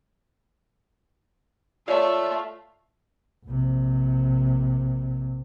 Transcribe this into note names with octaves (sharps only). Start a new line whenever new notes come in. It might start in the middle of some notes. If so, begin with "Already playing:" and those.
A3 F4 C#5 D5 E5
A#1 C3